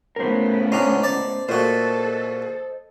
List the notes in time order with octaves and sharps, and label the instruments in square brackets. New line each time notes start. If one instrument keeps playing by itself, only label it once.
[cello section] A2 C#3 B3 [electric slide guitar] A#4 C5
[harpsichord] C#4 D4 [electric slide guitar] C5 D#5 A#5
[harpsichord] D5 A5
[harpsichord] A#2 F#4 [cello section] A4 [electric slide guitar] C5 D#5